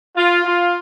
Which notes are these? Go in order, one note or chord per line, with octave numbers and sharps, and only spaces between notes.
F4
F4